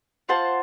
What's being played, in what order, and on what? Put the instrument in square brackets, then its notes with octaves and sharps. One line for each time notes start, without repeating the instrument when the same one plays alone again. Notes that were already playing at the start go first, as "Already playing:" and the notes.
[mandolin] F4 C5 F#5 A5